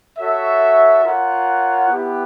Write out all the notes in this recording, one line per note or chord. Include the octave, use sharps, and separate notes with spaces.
F#4 A4 C#5 E5
F4 A#4 C#5 F#5
B3 E4 G4 B4